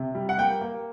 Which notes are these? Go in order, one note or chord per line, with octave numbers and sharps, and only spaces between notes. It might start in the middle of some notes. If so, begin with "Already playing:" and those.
Already playing: C3
G3
F#5
A#3 G5
A#3